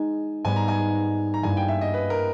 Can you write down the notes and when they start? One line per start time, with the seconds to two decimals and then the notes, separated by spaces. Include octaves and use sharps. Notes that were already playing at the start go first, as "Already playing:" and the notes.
Already playing: G#3 D#4 G#4 G#5
0.44 G#2 G3 B3 G#5
0.56 A#5
0.68 G#5
1.34 A#5
1.43 G2 G3 A#3 E4 G#5
1.57 G5
1.68 E5
1.81 D#5
1.94 B4
2.10 A#4